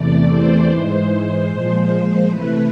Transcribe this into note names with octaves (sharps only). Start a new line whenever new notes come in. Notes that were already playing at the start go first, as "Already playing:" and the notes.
Already playing: E2 C3 E3 A3 D5
C5
G#2 E3 G#3
A#2 F3 G#3
C3 E3 A3 B4